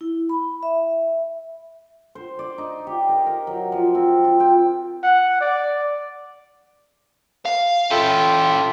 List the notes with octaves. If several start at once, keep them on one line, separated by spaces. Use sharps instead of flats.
E4
B5
E5
C5
D5
D#4
G4
A#4
A#4
F#3
F3
C4
F4
G5
F#5
D5
F5
C#4 F4 A4 E5 G5